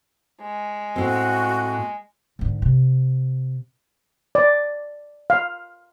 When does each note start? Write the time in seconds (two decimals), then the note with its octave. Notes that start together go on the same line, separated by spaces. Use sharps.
0.41 G#3
0.96 A2 C4 F#4
2.39 G#2 D3
2.62 C3
4.35 D5
5.30 F5